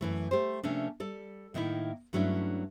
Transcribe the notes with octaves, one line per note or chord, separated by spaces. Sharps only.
F#2 E3 A3
A3 G4 C5
C3 F3 A3 A#3 C#4 D4
G3 A4 D5
A2 D#3 A#3 D#4 E4
G2 F#3 A3 C#4 D4 E4